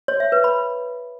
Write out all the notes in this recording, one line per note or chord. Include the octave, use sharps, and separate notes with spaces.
C#5
E5
B4
B5